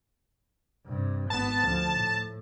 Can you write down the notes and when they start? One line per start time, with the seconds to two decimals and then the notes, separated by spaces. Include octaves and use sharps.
0.86 G2 C3
1.30 G#1 B3 A5
1.64 D2 F3
1.93 A2